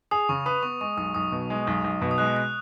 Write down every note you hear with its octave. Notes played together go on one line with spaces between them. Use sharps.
G#4 D#6
C#3 C#6
B4 D#6
B3 C#6
G#3 C#6
B1 D#6
B1 D#6
B2
G#3
B1
B1
B2
D#6
G#3 F#6
F#6